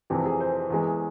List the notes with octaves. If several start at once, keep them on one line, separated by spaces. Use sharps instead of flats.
F1 F2 C3 E3 G4
G#4
C5
E2 E3 G#3